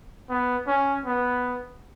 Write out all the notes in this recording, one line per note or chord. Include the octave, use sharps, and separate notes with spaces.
B3
C#4
B3